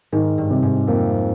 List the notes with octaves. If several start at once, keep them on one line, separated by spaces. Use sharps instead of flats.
G#2 D#3
G2
C3
G#2
F2 A#3